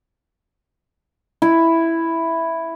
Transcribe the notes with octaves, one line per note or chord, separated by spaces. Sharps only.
E4